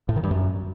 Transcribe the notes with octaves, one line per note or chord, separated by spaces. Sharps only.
A2
D#3
G2
F#2